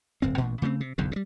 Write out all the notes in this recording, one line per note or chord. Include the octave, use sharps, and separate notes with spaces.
D1 G1 C4
A1 A#2
C#3 A3 B3 C4
C3
F#1 B1 E2 D3
C3 G3